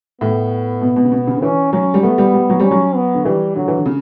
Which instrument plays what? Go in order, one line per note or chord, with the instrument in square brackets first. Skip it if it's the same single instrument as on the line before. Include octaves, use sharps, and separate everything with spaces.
[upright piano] A2 [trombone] B3
[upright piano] B2
B2
C#3
B2
C#3
D3
[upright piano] E3 [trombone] C#4
[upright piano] F#3 [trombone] C#4
[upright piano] G3
[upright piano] A3 [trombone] B3
[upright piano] G3
G3
F#3
[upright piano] G3 [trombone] C#4
[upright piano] F#3
[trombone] B3
[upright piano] D3
[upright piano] E3 [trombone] G3
[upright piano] D3 [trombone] F#3
[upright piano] E3
D3
C#3